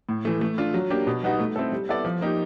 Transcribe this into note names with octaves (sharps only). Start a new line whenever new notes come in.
A2
E3 A3
A3
D4 F4
F#3
A#3 D4 G4
B2
G3 B3 D#4 F#4
A3
C4 E4 A4
G3
B3 E4 A4 D5
F3
A#3 D#4 G4